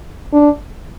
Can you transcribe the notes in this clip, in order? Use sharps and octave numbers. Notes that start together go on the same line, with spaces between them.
D4